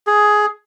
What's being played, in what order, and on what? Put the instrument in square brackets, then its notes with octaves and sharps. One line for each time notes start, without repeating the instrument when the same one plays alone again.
[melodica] G#4